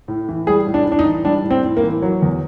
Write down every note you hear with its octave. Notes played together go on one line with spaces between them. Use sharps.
A2
E3
G3 G#4
A2
D4
A2
D4
D#4
E3
G3 D4
A2
C4
A2
A#3
E3
F#3
E2